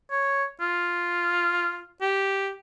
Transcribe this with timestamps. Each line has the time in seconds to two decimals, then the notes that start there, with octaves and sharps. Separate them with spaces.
0.11 C#5
0.60 F4
2.01 G4